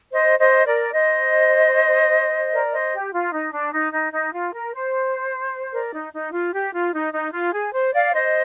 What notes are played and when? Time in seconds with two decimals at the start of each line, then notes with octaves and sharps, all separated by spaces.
0.12 C5 D#5
0.39 C5 D#5
0.66 A#4 D5
0.93 C5 D#5
2.53 A#4 D5
2.73 C5 D#5
2.93 G4
3.13 F4
3.32 D#4
3.53 D4
3.72 D#4
3.93 D#4
4.13 D#4
4.33 F4
4.54 A#4
4.73 C5
5.73 A#4 D5
5.93 D#4
6.14 D#4
6.33 F4
6.53 G4
6.73 F4
6.93 D#4
7.13 D#4
7.33 F4
7.53 G#4
7.73 C5
7.94 D5 F5
8.14 C5 D#5